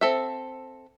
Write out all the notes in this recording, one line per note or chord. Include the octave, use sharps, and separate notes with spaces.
C4 A4 E5